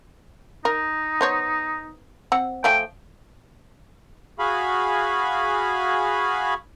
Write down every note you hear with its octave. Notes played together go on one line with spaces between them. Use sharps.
D#4 A#4
B3 C5 C#5
C4 F#5
F3 A3 G5 G#5
F#4 G#4 F5 G#5 B5